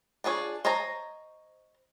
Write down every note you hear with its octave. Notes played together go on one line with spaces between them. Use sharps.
D4 F4 G#4 C#5
C5 C#5 D#5 A5 A#5